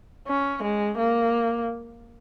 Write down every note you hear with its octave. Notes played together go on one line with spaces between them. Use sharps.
C#4
G#3
A#3